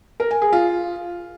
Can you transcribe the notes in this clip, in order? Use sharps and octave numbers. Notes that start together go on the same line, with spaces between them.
A#4
G#5
G#4
F4